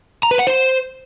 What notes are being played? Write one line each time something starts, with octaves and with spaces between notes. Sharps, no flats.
A#5
B4
F#5
C5